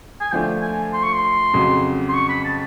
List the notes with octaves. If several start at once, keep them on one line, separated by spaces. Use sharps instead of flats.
G#5
D3 F3 A3 D4 G5
G#5
C6
C#6
C6
F2 C#3 F#3
C6
C#6
B5
A5